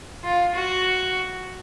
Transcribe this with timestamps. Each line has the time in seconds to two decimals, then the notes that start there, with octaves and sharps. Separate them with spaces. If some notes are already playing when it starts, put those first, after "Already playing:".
0.24 F4
0.54 F#4